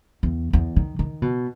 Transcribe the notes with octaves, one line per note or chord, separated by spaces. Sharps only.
E2
E2
D#3
D#3
B2